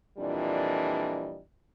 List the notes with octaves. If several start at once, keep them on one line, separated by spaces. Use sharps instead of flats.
F2 A#2 E3 G3 D4 D#5